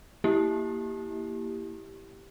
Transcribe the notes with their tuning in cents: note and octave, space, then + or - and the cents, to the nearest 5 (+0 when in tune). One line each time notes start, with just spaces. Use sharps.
A#3 +0 E4 +0 G4 +0